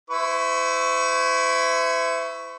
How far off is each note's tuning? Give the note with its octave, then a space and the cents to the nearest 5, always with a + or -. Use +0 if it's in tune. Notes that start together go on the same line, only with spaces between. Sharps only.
E4 +5 C5 -40 C#6 +0